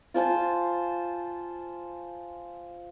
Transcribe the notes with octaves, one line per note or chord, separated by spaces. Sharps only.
F4 C5 G#5 A5